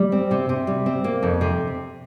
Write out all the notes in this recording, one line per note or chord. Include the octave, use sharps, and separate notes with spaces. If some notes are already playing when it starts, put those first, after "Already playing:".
Already playing: G3
C4
C3
C3
G3
C4
A#3
F2
C3